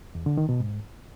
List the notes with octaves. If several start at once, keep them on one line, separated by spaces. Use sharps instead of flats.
E2
D3
D#3
B2
G#2